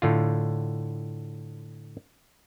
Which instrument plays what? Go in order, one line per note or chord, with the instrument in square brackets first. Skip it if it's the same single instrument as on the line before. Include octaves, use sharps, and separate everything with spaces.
[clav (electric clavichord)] A2 D3 F4